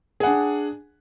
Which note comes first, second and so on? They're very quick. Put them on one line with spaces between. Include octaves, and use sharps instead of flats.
G#4 F#5 D4